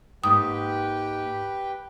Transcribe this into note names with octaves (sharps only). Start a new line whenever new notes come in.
G#2 A#3 G4 B4 G5 D#6